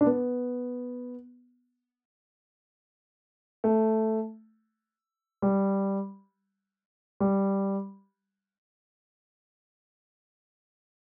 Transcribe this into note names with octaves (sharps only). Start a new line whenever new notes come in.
D4
B3
A3
G3
G3